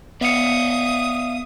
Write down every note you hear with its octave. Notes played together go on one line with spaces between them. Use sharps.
B3 D5 E5 F5 D#6 C#7